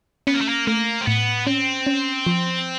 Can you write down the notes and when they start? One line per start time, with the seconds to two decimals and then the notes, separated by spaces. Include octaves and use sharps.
0.27 B3 C#4
0.34 A#3
0.41 A3
0.49 A#3
0.67 A3 A#3
1.01 C4
1.07 A2 B3
1.47 C4 C#4
1.87 C#4
2.26 F3